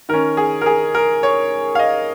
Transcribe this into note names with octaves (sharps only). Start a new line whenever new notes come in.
D#3 C#4 A#4
G#4
A#4
G#4
A#4
C#5
F5
D#5